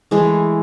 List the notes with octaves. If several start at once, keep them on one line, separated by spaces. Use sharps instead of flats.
E3 G#3 A3 E4 G#4